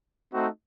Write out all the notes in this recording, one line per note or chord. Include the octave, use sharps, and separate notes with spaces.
A3 C4 D#4 F#4